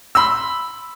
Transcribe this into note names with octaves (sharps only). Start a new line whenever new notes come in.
B5 C6 E6